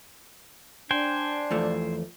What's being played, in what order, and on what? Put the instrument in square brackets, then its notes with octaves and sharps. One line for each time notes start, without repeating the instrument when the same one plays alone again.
[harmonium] D4 [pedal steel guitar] C5 G5 G#5
[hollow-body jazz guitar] E2 F3 A3